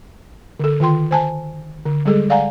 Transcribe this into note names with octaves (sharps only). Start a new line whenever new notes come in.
D3 A4
D#3 F4 G5 C6
C5 G#5 A5
D3
G3 G#3 G#4 A4
D5 F5 F#5 G#5 A#5